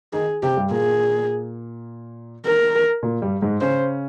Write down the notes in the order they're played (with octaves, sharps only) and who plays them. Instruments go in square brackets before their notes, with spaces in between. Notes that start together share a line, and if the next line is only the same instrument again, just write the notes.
[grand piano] D#3 D#4 [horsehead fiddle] G#4
[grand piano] C3 C4 [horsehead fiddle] G4
[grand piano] G2 G3
[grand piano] A#2 A#3 [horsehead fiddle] G#4
[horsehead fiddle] A#4
[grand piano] A#2 A#3
G2 G3
G#2 G#3
[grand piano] C#3 C#4 [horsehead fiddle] C5